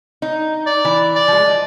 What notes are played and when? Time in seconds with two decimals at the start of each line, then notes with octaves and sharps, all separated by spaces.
0.22 D#4
0.66 D5
0.85 E3
1.15 D5
1.28 F3 G#3
1.46 D#5